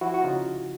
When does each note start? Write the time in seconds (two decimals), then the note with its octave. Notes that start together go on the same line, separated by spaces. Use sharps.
0.01 F3 E4 F#4
0.14 F#4
0.24 C#3 D#4 F4